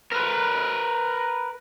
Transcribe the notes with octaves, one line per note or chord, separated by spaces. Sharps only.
A#4 B4